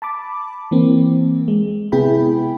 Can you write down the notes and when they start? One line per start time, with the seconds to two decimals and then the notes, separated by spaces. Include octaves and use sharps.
0.02 A5 B5 D6
0.71 E3 A#3 C4
1.48 G#3
1.92 C3 B3 E4 G#4 G5 B5